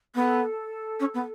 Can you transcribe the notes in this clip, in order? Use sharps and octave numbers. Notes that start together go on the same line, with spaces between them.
B3 A4
C#4
B3